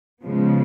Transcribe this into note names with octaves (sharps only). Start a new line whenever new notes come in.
C#3 F3 G#3 B3